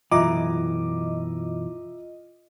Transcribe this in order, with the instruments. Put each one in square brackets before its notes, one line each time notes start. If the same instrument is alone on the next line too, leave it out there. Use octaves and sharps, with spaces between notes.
[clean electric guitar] B1 F#2 E3 [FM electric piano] F4 D#5 [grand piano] E5 A#5 D6